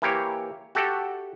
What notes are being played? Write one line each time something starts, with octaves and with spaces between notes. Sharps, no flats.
E3 A#3 G4 C#5
F#4 G4 A4 E5